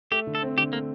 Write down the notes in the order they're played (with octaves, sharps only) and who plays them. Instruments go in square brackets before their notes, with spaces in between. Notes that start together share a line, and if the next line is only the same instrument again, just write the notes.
[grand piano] A3 [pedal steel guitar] G4
[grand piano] D3
[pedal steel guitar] A4
[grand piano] C4
[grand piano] D3 [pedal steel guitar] G4
[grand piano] A3 [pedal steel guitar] A#3